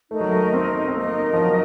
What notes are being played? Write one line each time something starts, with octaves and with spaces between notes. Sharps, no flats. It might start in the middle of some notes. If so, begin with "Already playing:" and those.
A3 D#4 A#4 D#5
F#3
A3
C4
C4
A#3 D#4 A#4 D#5
F3
F#3